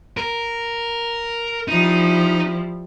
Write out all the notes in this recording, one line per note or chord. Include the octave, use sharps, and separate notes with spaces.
A#4
F3 G3 D#4 E4